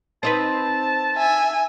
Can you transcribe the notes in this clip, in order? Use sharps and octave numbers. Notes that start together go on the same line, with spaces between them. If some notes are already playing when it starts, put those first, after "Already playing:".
C4 D#4 B4 A5
E5 G#5